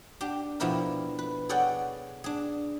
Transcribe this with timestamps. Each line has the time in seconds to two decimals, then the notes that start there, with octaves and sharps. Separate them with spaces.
0.21 D4 G4
0.60 B2 F3 D4 E4 G4 A#4
1.19 B4
1.49 G#4 A4 C#5 D5 F#5 G5
2.24 D4 G#4